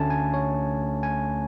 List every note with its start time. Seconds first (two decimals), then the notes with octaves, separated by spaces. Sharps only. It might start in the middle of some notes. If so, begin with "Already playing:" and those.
Already playing: D2 D3 A3 C#4 G#5 A5
0.10 G#5
0.34 C#5
1.03 G#5